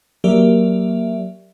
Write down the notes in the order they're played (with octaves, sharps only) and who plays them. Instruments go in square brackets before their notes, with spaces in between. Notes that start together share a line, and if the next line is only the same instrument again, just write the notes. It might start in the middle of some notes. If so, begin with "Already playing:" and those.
[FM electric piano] F#3 A#3 G4 A#4 D5 E5